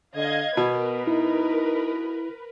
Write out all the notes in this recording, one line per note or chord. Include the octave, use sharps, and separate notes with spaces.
D3 D#5 F5 G#6
B2 B3 A#4 B4
D#4 E4